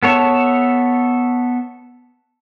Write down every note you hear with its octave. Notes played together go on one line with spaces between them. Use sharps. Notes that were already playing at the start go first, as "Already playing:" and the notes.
B3 A4 C#5 E5